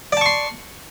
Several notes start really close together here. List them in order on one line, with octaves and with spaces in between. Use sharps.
D5 A5 C#6 C6